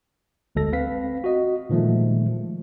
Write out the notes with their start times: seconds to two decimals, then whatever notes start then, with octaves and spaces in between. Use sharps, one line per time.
0.55 G1 D2 G#3 A4 A#6
0.72 C4 B4 F5 B6
1.24 F#4 D#5
1.69 A#2 D#3 F3 G#3 A3